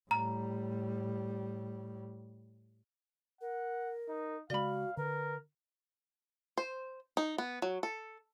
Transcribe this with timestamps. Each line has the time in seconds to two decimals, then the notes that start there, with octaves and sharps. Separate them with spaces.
0.11 A2 G3 A#5
3.41 A#4 F#5
4.08 D#4
4.50 C#3 G#3 F#4 D5 F5 B5
4.97 D3 A#4 B4
6.57 C5
7.17 D#4
7.38 B3
7.62 F#3
7.83 A4